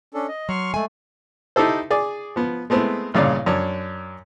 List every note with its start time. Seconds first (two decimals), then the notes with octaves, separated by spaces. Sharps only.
0.14 C#4 D4 A4
0.28 D#5
0.49 F#3 C6 C#6 F6
0.74 G#3 A3 G#5
1.56 D#4 E4 G4 A4 C5
1.91 G#4 D5
2.36 F3 B3
2.70 G#3 A3 B3 C4 E4
3.14 A1 G2 A#2 C#3 C#5 D5
3.46 F#2 D4 C#5